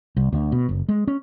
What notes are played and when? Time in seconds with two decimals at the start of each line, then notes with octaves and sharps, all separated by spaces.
0.17 C2
0.33 D2
0.52 B2
0.69 F#1
0.89 G#3
1.07 C#4